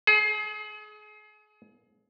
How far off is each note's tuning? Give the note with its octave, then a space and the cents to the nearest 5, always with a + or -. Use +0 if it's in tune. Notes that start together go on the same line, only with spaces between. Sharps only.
G#4 +35